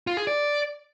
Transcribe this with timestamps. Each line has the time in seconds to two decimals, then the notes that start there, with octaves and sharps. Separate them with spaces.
0.07 F4
0.17 G#4
0.27 D5